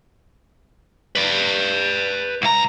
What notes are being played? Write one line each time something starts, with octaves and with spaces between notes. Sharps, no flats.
B4 D5
C2 A#5